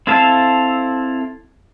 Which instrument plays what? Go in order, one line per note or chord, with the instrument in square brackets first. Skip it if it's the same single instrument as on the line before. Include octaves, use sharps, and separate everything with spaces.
[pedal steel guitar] C4 E4 A4 F5 A5